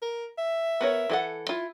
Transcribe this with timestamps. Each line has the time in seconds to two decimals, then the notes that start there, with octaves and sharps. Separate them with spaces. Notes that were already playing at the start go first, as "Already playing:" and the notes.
0.02 A#4
0.38 E5
0.81 B3 A#4 C#5
1.10 E3 A4 F#5
1.49 E4 F4